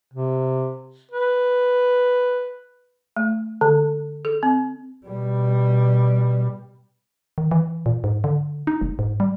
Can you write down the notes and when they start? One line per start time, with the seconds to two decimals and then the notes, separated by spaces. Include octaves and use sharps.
0.14 C3
1.11 B4
3.16 A3
3.61 D3
4.25 A4
4.43 C4
5.07 B2 G3
7.38 D#3
7.51 E3
7.86 A#2
8.04 G#2
8.24 D3
8.67 D#4
8.81 F1
8.99 G#2
9.20 G3